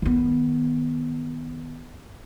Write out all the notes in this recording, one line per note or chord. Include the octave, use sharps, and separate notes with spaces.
D#3 B3